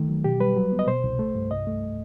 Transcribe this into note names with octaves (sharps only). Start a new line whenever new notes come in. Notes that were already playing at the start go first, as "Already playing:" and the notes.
Already playing: D#3 A3
F#3
B2 G4
G3 B4
F#3
B3
D#5
B2 C5
C2
A3
G2
C2 D#5
A3